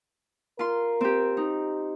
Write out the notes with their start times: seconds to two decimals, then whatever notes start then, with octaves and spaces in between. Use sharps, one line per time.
0.59 F4 A#4 C6
1.01 C4 G4
1.37 D#4